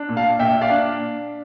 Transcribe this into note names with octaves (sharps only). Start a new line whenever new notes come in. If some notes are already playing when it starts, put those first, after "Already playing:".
Already playing: D4
A#2
F5 A5
A#2 E5 G5
D5 F5
D4